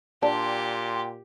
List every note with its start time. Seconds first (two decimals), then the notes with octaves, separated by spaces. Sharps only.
0.23 A#2 D4 G4 G5 C6